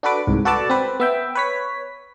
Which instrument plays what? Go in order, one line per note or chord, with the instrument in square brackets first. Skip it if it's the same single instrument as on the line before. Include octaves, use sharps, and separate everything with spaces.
[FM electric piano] D4 F#4 A4 B4 D6
C2 G#2
F#4 A4 B4 D5 A5
C4 B4
B3 E5 G5
B4 C#5 B6